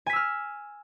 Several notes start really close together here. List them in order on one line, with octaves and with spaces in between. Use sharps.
G#5 B6 E6 F6